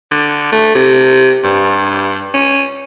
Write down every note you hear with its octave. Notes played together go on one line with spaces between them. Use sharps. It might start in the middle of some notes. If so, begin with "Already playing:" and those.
D3
A3
C3
G2
C#4